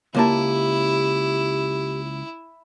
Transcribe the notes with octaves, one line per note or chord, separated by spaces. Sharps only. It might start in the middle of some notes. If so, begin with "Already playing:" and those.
C#2 A#3 E4 G4 A5